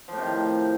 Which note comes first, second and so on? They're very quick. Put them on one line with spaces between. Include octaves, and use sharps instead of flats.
F3 A2 C3 D#3